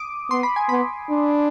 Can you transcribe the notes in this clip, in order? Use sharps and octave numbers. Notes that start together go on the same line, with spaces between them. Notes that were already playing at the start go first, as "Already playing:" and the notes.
Already playing: D6 D#6
B3 C6
B5
G#5
B3 B5
D4